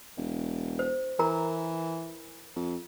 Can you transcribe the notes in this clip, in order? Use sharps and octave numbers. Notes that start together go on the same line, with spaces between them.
E1
C5
E3 A#4 A#5
F2